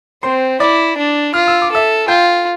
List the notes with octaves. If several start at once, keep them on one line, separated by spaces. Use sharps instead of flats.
C4 C5 C6
E4 D5 D6
D4
F4 F6
E6
D6
A4 E5 E6
F4 G5 G6